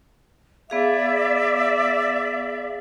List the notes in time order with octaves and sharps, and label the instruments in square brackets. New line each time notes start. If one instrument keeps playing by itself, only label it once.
[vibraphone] B3 G#4 F5 [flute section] D5 E5